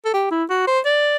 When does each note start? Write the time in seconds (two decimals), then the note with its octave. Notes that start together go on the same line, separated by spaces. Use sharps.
0.05 A4
0.14 G4
0.31 E4
0.50 F#4
0.67 C5
0.85 D5